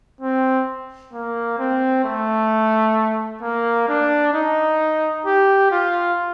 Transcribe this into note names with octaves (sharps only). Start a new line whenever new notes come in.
C4
A#3
C4
A3
A#3
D4
D#4
G4
F4